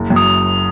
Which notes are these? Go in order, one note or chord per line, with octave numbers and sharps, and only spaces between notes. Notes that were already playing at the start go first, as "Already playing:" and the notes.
Already playing: F#1
F#2
D#6